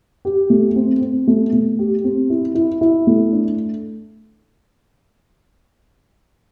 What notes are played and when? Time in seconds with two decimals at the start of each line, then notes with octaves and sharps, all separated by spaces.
0.25 G4
0.50 A3
0.76 C4
1.02 C4
1.28 A3
1.53 A3
1.79 G4
2.04 C4
2.30 E4
2.55 E4
2.81 E4
3.07 A3
3.32 D4